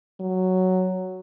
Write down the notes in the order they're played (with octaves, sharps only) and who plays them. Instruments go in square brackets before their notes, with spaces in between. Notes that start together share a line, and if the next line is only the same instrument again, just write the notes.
[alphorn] F#3